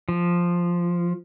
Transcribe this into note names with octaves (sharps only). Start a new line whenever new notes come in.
F3